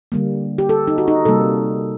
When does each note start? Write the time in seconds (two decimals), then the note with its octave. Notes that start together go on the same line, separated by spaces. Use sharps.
0.12 D3 G3 A#3
0.58 G4
0.69 A4
0.88 D#4
0.98 F#4
1.08 D#4
1.25 C3 G3 A#3 A4